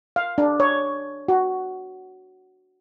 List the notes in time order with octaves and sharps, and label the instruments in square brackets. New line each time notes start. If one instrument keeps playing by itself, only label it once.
[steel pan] F5
D4
C#5
F#4